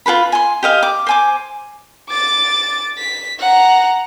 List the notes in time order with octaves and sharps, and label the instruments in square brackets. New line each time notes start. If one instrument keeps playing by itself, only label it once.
[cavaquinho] F4 G#4 B4 B5
G#5 C6
G4 D#5 F5
D6
C5 G#5 D6
[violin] D6 A6
B6
F#5 A#5